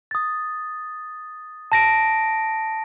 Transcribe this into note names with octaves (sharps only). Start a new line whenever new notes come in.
D#6 A6
A5 A#6 D7